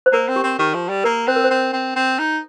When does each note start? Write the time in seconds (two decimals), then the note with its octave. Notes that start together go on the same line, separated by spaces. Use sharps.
0.06 C5
0.13 A#3 A#4
0.28 C4
0.36 G4
0.44 C4
0.59 D#3 G4
0.74 F3
0.89 G3
1.04 A#3 A#4
1.27 C4 C5
1.36 A#4
1.44 C5
1.51 C4
1.73 C4
1.96 C4
2.19 D#4